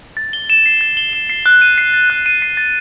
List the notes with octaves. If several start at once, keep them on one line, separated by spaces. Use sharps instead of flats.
A6
G7
E7
C7
A6
G7
E7
C7
F#6
D#7
C7
A6
F#6
D#7
C7
A6